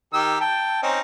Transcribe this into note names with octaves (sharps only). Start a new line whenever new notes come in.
D#3 G4 E6
G5 A5
C4 C#4 D#4